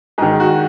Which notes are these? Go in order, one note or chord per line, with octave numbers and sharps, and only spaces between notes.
G#2 D#3 G#4
F#4